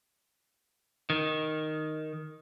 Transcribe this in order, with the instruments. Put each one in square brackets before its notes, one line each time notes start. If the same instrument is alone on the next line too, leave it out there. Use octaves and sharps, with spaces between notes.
[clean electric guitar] D#3